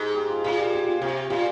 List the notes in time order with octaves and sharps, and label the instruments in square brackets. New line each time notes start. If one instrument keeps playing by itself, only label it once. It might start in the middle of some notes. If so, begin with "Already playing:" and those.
Already playing: [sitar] G#2 [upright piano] G4
[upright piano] G4
F4
[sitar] A#2 [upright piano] F4
[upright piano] G4
G4
F4
[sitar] C3 [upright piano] G4
[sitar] A#2 [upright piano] F4